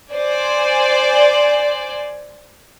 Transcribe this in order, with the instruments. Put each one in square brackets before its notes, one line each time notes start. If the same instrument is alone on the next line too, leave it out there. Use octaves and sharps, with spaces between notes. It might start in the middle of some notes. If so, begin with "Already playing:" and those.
[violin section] C5 D5 G#5